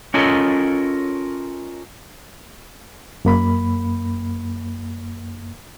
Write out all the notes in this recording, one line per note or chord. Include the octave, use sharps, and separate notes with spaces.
C#4 F4 A4 A#4 C#5 D#5
F#2 A#3 B5